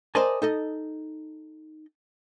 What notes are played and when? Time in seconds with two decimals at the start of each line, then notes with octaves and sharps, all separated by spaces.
0.15 A#4 C5 D5 D#5 G#5 A5
0.42 D#4 A4 D#5